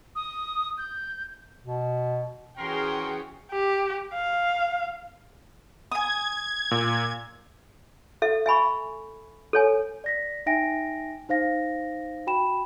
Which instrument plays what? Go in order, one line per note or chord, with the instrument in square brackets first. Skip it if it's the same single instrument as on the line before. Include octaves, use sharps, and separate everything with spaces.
[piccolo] D#6
G6
[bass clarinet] B2
[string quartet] E3 C#4 F#4 [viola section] G#4 G5 [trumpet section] A#4 C6
[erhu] G4
F5
[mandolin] G#5 D#6 [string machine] G#6
[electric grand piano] A#2
[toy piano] A4 E5
E5 G#5 B5 C#6
A4 C#5 G#5
[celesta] D5 A#6 B6
D#4 E5 G5 G#5 A#6 D7
D#4 C5 F5 A#6
F#4 G5 B5 E7